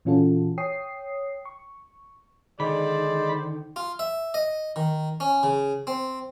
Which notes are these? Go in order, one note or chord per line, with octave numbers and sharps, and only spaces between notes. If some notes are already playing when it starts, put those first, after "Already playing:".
A#2 E3 C#4 F4 F#4 A4
C#5 G5 D#6 C7
C#6
D3 D#3 G#3 C5 D5 B5
F4
E5
D#5
D#3
C#4
C#3
C4